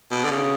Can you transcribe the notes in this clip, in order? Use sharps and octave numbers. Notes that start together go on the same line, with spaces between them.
B2
D3
C#3